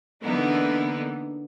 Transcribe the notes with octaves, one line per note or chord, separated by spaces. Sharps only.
D3 E3 A#3 B3 D#4